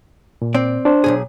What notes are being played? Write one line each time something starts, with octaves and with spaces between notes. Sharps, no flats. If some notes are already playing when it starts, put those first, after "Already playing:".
A#2
C4 D5
D4 C5
B1 G#2 G#4